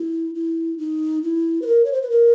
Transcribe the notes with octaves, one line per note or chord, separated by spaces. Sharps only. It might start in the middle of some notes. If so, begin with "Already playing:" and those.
Already playing: E4
E4
D#4
E4
B4
A#4
C#5
C5
B4
A#4